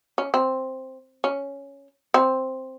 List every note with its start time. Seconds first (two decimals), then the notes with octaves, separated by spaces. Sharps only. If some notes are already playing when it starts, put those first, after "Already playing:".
0.18 C#4
0.34 C4
1.24 C#4
2.14 C4